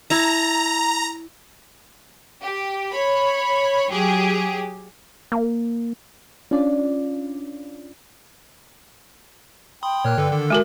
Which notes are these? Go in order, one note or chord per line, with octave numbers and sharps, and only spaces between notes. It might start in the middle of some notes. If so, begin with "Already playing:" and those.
E4 A5 A#5
G4
C#5 B5
F#3 G4 G#4
A#3
C#4 D4 F4 D5
G5 B5 C6 D#6
A#2 C#5 F6 F#6
G2 D3 A4 B4
D#3 A4
G#3 F#4 A#4 G#5